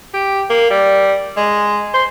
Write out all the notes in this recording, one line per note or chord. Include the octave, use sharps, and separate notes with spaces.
G4
A#3
G3
G#3
C5